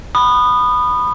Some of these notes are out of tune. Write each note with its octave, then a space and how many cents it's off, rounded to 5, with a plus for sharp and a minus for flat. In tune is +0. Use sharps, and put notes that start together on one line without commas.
B5 +5 D#6 -25